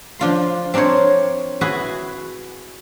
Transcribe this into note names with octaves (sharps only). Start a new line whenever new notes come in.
F3 D4 F4 C6
C4 D4 A#4 C5 C#5
E4 F#4 G#4 B4